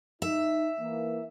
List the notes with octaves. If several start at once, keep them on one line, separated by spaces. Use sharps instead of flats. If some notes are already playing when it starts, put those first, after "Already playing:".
D#4 E5
E3 A#3